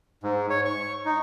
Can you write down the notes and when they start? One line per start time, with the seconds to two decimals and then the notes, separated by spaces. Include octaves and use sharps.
0.23 G#2
0.50 C#5
0.65 C#6
1.05 D#4